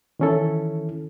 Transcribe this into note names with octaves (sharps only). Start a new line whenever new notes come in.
D#3 E3 C#4 E4 A4